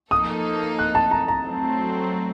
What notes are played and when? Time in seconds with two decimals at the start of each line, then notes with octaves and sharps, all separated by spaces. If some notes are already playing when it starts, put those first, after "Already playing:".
0.11 F3 A#3 D#4 A4 D#6
0.79 F#6
0.95 A5
1.11 A#5
1.28 A#5
1.45 F#3 A3 C4